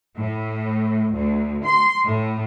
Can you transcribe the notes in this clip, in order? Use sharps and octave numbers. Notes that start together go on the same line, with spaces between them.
A2
D2
C6
A2